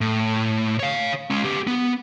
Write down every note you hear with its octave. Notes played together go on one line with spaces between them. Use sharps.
A2
C#5 F5
G#3 C#4
B3 G4
B3